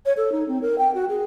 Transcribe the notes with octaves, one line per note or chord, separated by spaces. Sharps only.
C#5
A4
D#4
C4
A#4
G5
F#4
G#4